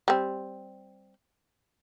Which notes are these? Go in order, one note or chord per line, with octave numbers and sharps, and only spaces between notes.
G3 C4